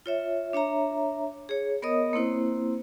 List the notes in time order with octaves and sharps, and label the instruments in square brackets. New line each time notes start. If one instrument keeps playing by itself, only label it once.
[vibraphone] F4 C#5 E5
D4 C#5 E5 A#5
G#4 C#5
B3 A#4 C#5 D#5 D#6
A#3 C4 E4 C5